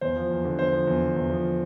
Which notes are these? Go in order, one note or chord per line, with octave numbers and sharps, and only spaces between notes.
E2 C5
F3
E2
D3
E2 C5
F3
E2
D3
E2
F3